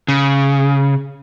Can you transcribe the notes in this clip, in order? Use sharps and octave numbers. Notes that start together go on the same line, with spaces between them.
C#3